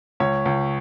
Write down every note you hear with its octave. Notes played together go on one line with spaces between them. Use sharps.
C#2 C#5
C#2